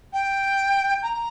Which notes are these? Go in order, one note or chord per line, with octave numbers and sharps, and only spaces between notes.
G5
A#5